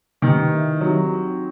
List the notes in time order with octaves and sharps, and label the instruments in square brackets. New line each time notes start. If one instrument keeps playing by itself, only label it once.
[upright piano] D#3 [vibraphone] G3 D#4 G4 B4 D#5
[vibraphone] E4 B4 E5
[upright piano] F#3 [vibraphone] C4 D#4 G4
[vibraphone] G3 C4 D#4